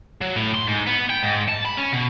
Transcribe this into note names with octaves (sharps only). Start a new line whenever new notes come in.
F#3
A2
C6
G#2
B3
G5
G#2
A5
B5
C#4
B2